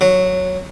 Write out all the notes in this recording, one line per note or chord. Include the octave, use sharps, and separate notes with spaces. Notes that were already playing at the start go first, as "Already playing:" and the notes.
F#3